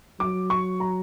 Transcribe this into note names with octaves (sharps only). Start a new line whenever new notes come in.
F#3 D6
C#6
A#5